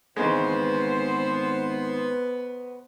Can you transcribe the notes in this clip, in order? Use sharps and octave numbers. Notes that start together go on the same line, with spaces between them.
G#1 C#3 E3 G#3 B3 C5